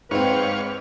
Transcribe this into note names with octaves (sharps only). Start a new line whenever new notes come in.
G#2 C4 B4 C#5 F5 G5